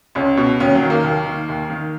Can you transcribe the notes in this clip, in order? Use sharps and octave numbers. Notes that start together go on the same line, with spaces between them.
C#2 C#4
B2
D#2 C#4
F#3
D#3
A#3
D#2
D#3
D#2
D#3